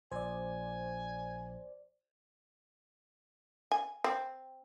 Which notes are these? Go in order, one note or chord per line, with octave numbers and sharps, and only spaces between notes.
A#1 C5 D5 G#5
G#5
C4